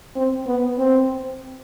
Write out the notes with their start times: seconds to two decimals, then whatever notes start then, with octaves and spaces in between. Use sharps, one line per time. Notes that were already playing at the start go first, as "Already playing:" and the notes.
0.16 C4
0.47 B3
0.78 C4